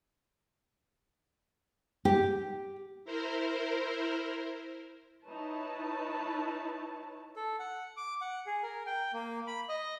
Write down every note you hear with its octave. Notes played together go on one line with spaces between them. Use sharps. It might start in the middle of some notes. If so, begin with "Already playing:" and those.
G4
E4 A#4 C5
D#4 E4 B4 C#5 A5
A4
F#5
D6
F#5
G#4
A#4
G5
A#3
B5
D#5